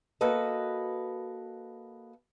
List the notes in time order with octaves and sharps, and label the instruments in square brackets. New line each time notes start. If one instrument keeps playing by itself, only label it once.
[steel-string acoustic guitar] A#3 F#4 A4 B4 D#5